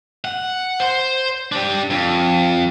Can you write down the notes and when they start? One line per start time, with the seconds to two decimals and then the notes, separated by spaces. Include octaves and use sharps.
0.25 F#5
0.80 C5 C6
1.52 D4 G4
1.90 F2